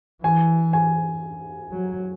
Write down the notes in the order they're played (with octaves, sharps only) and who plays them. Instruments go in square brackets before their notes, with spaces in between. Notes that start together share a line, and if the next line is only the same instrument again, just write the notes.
[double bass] E3 [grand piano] G#5
[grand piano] G#5
[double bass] F#3